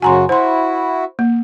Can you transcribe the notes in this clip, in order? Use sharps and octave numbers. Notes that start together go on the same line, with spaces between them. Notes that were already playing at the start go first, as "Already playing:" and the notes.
F#2 C#3 F#4 G#5 A#5 C6
E4 F#4 C5 C6
A#3